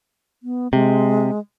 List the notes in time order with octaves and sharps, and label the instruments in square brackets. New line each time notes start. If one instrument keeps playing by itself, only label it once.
[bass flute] B3
[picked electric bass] C3 [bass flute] G#3